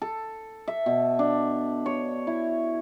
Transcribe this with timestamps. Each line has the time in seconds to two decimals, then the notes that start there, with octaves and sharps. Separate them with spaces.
0.02 A4
0.68 E5
0.86 B2
1.19 D4
1.86 C#5
2.27 E4